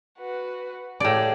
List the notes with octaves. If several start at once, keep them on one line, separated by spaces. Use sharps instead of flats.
F#4 B4
A2 G4 G#4 D5 F5